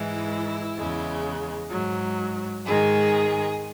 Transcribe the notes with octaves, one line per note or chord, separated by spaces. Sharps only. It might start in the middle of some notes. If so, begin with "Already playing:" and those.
Already playing: G#2 E3 G#3 E4
E2 C#3 G#3
G#2 F#3
G#2 D#3 G#3 G#4